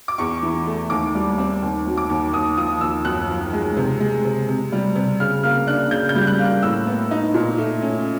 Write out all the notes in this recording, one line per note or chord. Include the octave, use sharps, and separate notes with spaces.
D6
E2 C#6
E3
A3
D#2 D6
G3
C4
D#2
F#3
D6
D#2
D#2 D#6
F3 D#6
D#2 E6
F#2 F#6
F3
G#3
C3
G#3
C3
C3
G3
C3
C#3 F6
A#3 F6
D4 F#6
C#3 G6
G6
G3
F#6
A#3
F#6
A2 E6
B3
D#4
A#2
A3
C#4